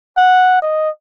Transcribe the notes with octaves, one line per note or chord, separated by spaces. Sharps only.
F#5
D#5